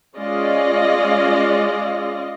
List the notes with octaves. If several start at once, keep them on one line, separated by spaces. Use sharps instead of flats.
G#3 C#4 F4 D5 D#5 F5